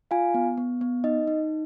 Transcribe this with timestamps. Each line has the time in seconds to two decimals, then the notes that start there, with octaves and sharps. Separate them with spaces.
0.11 F4 F5 G#5
0.34 B3
0.57 B3
0.81 B3
1.04 D#4 D#5
1.27 D#4